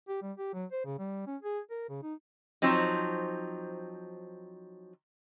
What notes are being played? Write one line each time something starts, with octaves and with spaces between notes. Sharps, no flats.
G4
G3
G4
F#3
C5
C#3
G3
C#4
G#4
A#4
C#3
D#4
F3 F#3 C4 D#4